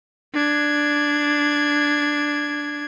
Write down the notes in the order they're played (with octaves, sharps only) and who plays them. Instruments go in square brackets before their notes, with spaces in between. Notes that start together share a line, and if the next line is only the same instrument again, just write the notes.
[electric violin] D4 G#6